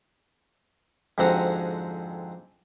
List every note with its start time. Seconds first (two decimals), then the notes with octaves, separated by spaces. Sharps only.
1.18 F2 G#2 D3 C4 F#4 A#5